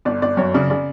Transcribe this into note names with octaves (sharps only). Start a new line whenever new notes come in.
G1 D5
G1 D5
F#2 C#5
C#3 D5
C#3 D5